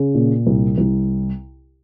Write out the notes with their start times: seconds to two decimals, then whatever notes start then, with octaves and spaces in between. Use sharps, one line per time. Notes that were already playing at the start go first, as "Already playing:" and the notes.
Already playing: C#3
0.15 A#2
0.47 C2
0.78 C2